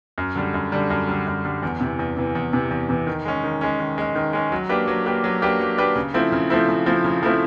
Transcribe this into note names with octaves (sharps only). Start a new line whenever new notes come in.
F#2
D3 G3
F#2
D3 G3
F#2
D3 G3
F#2
D3 G3
E2
C3 E3
E2
C3 E3
E2
C3 E3
E2
C3 E3
D#3
G#3 C#4
D#3
G#3 C#4
D#3
G#3 C#4
D#3
G#3 C#4
F#3
A#3 D4 G4 B4
F#3
A#3 D4 G4 B4
F#3
A#3 D4 G4 B4
F#3
A#3 D4 G4 B4
C#3
F3 A3 C4 E4
C#3
F3 A3 C4 E4
C#3
F3 A3 C4 E4
C#3
F3 A3 C4 E4